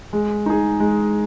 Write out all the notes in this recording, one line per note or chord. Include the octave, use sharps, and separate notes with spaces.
G#3
D#4 G#4
G#3